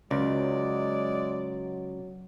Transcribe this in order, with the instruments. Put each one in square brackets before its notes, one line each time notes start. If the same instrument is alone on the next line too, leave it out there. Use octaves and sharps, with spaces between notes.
[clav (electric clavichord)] C#2 [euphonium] F#3 [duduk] G#3 [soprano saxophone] D5